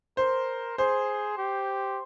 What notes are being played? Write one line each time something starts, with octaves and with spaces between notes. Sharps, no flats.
A#4 C5
G#4 C5
G4